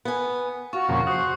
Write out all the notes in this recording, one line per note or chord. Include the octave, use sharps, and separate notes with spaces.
B3 G#5
F4 F#4 C#6
F2 A#2 C#3
F#4 C5 D#6